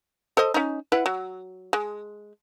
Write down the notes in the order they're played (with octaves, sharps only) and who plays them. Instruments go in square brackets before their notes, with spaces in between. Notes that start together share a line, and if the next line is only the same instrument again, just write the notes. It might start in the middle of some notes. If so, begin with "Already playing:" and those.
[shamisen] A4 C5 D#5
C#4 D#4
E4 B4 F#5
F#3
G#3